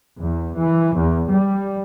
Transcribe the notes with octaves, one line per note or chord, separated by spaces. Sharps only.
E2
E3
E2
G3